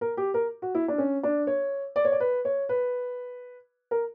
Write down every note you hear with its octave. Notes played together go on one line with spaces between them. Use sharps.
A#4
G4
A#4
F#4
E4
D4
C#4
D4
C#5
D5
C#5
D5
B4
C#5
B4
A#4